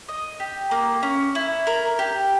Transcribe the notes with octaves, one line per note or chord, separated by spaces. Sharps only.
D#5
G4
A#3
C#4
E4
A#4
G4